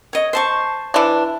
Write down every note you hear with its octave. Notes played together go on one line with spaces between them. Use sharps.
C#5 D#5
C5 A5 C#6
E3 D4